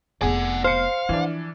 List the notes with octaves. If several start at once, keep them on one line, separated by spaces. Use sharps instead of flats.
F1 B3 G#4 D5 F#5
C5 F5 F6 C#7
E3 F3 D4